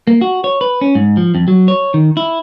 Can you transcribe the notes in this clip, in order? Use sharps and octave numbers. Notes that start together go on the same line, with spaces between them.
A#3
F#4
C#5
B4
C#4
G#2
F3
F2
F#3
C#5
D#3
E4